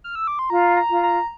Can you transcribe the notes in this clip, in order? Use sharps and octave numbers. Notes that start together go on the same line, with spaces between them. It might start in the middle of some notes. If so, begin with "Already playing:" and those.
F6
E6
D6
C6
F4 A#5
A#5
F4
A#5